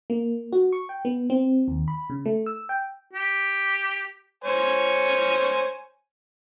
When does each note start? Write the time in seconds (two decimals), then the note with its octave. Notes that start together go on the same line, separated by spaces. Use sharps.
0.10 A#3
0.53 F#4
0.73 C#6
0.89 G5
1.05 B3
1.30 C4
1.68 D#2
1.88 B5
2.10 C#3
2.26 A3
2.46 E6
2.69 G5
3.13 G4
4.44 C5 C#5 G#5